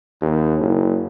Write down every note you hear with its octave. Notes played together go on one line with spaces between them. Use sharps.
D#2
F#1